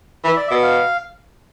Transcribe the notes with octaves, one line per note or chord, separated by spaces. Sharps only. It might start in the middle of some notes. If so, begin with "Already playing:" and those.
E3 E5
D5
E5
B2
F5